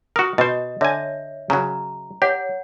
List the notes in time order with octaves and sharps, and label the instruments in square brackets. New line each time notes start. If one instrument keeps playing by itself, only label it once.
[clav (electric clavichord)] F#4 A#4 [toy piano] D#6
[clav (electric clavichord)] B2 C5 [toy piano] D#5
[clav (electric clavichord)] D3 G#5 [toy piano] C#5 E5
[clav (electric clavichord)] C#3 F#3 [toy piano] A#5
[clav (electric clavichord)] G4 [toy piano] C#5 F#5